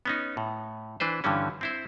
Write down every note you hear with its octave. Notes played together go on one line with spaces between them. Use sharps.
B3 C#4 D#4
A2
E3 D4 B4 C5
G2 D3 E3 G3 C#4
C4 E4 C5